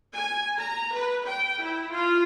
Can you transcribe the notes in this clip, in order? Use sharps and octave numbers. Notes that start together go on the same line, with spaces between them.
G#5
A#5
B4
G5
E4
F4